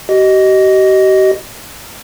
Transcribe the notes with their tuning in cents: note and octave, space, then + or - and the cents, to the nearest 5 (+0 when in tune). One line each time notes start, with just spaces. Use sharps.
G4 -45 D#5 +0